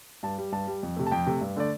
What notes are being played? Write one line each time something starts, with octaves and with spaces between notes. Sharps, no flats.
G2 A5
G3
G2 A5
G3
F2
C3 A3
A5
F2 G5
C3 A3
G2
D3 A3 D5